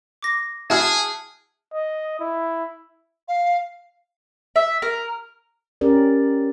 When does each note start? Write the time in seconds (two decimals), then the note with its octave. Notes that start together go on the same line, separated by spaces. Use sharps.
0.23 D6 A#6
0.70 E4 F#4 G#4 G#5 A5 F6
1.74 D#5
2.20 E4
3.28 F5
4.56 E5
4.82 A#4
5.81 C#4 G4 A#4 D5